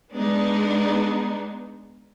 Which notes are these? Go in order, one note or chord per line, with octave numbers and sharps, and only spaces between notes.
G#3 B3 D4 D#4